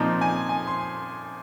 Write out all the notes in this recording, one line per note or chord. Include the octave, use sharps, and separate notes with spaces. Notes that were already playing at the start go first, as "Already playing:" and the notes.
Already playing: A#2 F3 C4 D#4 A#5
G#5
G#5
C6